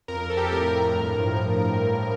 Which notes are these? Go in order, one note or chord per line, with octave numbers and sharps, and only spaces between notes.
F2 A#4
F2 A4
G4
A4
A2 A#4
A#4
A2
A#4
G2
F3